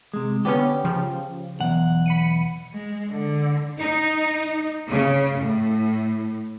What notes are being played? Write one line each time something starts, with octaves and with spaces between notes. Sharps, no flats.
C3 G#3
D3 B3 C#4 G4
C#3 F3
B1 E2 F#5
B5 C#7 D#7
G#3
D3
D#4
C#3
A2